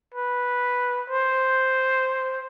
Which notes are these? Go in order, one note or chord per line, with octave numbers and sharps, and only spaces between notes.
B4
C5